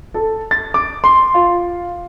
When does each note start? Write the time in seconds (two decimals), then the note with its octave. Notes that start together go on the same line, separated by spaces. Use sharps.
0.14 A4
0.51 A6
0.74 D6
1.04 C6
1.34 F4